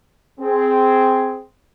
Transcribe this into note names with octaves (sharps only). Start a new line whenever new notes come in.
C4 G#4